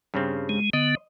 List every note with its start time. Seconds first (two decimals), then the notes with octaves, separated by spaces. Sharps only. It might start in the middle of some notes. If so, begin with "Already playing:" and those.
0.14 G2 C#3 C4
0.49 G#3
0.73 D3 B3 D#5